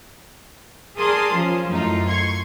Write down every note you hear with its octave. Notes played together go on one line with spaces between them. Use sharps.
G#4 A#4 D5 A5 C6 D#6
F3 C#4 F4
F#2 A2 A3 D#4 F4
C6 C#6 G#6